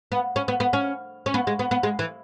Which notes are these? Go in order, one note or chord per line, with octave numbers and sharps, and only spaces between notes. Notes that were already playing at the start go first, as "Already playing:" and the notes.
B3
C#4
B3
B3
C#4
C#4
B3
G#3
B3
B3
G#3
E3